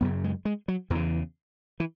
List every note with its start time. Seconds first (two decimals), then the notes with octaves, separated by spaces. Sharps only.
0.01 F#2 C#3 B3
0.24 G#3
0.45 G#3
0.68 F#3
0.90 E2 C#3 E3
1.80 E3